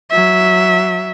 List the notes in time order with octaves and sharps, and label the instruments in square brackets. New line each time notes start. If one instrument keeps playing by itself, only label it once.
[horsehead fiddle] F#3 E5